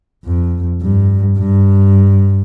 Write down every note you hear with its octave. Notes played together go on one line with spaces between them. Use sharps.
F2
G2
G2